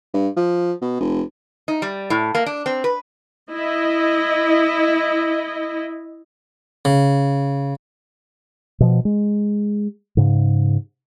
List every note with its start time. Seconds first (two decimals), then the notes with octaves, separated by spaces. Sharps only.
0.14 G2
0.36 F3
0.81 B2
1.00 F1
1.68 D#4
1.82 G3
2.10 A2
2.35 A#3
2.46 D4
2.66 C4
2.84 B4
3.50 E4 D#5
6.85 C#3
8.80 B2 F3
9.05 G#3
10.17 G#2 C#3